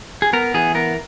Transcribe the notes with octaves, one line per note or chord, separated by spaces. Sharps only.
G#4
B3 A#4
E3 G#4
B3 A#4